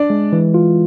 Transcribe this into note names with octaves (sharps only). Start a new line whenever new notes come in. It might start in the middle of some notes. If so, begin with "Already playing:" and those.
Already playing: D4 D5
G#3
E3
F4